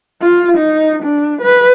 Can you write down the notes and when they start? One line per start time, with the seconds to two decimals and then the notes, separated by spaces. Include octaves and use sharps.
0.21 F4
0.58 D#4
1.03 D4
1.42 B4